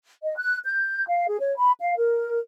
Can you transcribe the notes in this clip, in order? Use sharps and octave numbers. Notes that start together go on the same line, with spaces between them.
D#5
F#6
G6
F5
G#4
C#5
B5
F5
A#4